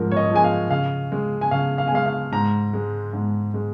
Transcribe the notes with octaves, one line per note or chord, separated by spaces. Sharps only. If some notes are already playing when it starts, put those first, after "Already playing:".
Already playing: G#2 F3 A#4
C#5
D#5
F3 G#3 G#5
F5
C#3 F5
G#3
G#5
C#3 F5
F5
G#5
G#3 F5
F5
G#2 A#5
G#3
G#2
G#3